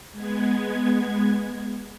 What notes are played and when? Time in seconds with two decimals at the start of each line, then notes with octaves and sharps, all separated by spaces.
0.12 G#3 B3 G#6